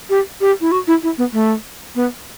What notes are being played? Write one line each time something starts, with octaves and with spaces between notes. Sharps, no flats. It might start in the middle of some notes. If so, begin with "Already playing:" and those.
G4
G4
E4
F#4
E4
E4
B3
A3
B3